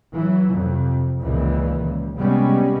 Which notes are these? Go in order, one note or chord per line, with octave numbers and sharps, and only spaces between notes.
E3 F#3
F2 C3
C#2 A#2 D#3 E3
C#2
C3 G3 G#3 B3 C#4